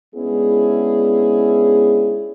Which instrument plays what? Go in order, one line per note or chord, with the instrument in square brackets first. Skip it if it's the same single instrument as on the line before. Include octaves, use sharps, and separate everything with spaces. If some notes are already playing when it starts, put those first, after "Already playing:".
[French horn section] G#3 B3 C#4 D4 E4 G#4